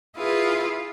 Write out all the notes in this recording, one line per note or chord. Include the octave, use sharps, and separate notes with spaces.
E4 F4 G#4 B4 F5